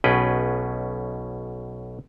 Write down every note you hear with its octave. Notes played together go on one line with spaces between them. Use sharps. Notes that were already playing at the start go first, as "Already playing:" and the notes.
B1 B2 C#4 G#4 B4 G5